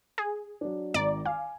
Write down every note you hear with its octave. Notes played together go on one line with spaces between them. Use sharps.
G#4
F#3 D4
G#1 D#3 D5 A#5
F5 G#5 D6